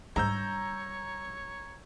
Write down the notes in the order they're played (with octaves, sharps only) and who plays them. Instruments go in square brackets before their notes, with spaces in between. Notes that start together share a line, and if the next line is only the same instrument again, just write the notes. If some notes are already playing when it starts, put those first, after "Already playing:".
[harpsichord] G#2 [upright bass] G3 D4 [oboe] C#5 [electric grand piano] A#5 E6 G6